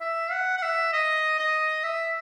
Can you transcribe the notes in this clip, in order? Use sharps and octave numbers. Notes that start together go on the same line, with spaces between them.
E5
F#5
F#5
E5
D#5
D#5
E5